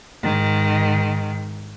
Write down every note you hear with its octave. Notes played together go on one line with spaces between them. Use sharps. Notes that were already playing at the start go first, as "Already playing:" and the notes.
G#2 D#3